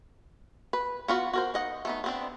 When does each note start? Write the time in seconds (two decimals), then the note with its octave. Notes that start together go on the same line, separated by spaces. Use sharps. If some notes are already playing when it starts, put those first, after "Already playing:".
0.73 B4
1.08 B3 F4 F#4
1.33 F#4 A#4 C5
1.54 D#4 D#5 F#5
1.85 A3 B3 D#4
2.04 B3 C4 D4